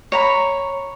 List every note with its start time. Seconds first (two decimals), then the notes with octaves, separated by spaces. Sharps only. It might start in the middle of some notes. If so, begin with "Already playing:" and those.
0.12 C#5 A#5 B5